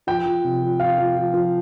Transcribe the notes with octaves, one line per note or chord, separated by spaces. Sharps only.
F3 G5
F3
C3
F3
F3 F5
F3
F3
F3